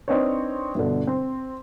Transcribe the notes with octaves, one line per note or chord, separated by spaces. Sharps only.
C4 D4 D#4 B4 C#5
G1 B2 D3
C4